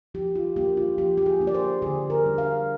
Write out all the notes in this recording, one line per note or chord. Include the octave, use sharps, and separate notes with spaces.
F3 G4
F4
A#3 D4 G4
F4
F3 G4
G4
G#4
A#3 D4
D5
C5
D3 G#4
A#4
G3 D4
F5